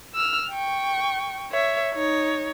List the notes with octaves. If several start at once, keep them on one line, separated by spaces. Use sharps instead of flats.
E6 F6
G5 C#6
C#5 E5
D#4 C#5